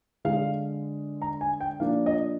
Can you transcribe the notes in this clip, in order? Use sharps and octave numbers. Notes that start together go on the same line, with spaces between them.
D3 G#3 D4 F5
A#5
G#5
G5
A#2 F3 A#3 D4 F5
D#5